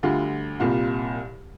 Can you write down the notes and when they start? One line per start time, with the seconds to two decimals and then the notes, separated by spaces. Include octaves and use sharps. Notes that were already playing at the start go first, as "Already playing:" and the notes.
0.03 D2 D3 G3 F4
0.60 C2 A#2 G3 F4